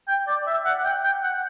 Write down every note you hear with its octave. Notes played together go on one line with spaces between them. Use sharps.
G5
D5
E5
F#5
G5
G5
F#5